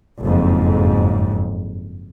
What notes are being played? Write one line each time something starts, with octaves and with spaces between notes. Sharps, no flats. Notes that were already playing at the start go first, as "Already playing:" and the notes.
F#1 F2 G#2